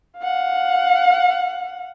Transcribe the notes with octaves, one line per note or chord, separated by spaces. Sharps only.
F5 F#5